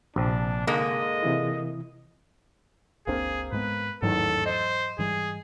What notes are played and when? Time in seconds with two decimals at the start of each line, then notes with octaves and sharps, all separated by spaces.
0.16 A#1 C3 C4 D4
0.67 G#2 D3 G#3 A#3 D#5
1.23 C3 E3 E4
3.07 F#1 C#2 A#3 C4 D4 G#4 A#4
3.52 G#2 G#3 B3 B4
4.02 A1 E2 G#2 D#3 E3 F#3 A4
4.46 C5 D#5
4.99 G#2 E3 G3 G#4